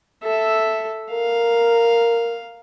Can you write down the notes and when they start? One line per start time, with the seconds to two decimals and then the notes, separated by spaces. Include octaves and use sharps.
0.23 A4 E5
1.12 A#4 F5